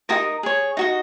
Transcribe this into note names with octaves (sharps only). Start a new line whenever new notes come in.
D#4 F#4 A#4 D#6
G#4 C#5
D#4 F#4 D#5